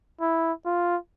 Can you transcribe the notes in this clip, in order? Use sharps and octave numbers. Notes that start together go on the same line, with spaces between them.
E4
F4